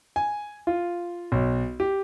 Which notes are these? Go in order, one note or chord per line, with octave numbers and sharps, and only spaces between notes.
G#5
F4
B1
G4